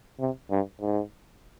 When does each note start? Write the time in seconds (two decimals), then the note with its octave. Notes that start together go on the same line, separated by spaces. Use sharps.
0.20 C3
0.51 G2
0.81 G#2